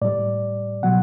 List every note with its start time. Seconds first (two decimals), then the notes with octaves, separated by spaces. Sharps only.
0.02 A2 G3 D5
0.83 B2 F#3 F#5